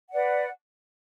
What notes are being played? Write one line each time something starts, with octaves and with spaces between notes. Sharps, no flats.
B4 D5 F#5